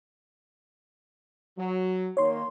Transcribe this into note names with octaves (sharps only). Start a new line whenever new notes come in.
F#3
D#3 A#3 C#5 C6